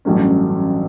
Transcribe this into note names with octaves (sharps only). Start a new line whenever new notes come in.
A1 G2 F#3 A3 C#4